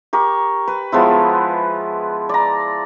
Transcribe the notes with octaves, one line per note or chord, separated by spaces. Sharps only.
G4 A#4 C#6
B4
F3 G#3 B3 E4
D5 A#5